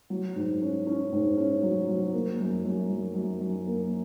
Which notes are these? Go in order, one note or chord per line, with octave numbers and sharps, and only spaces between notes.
F#3
G#2
C#4
C#4
G#2
C#4
F#3
F#3
A#3
F#2
F#2
F#2
F#2
F#2
A#3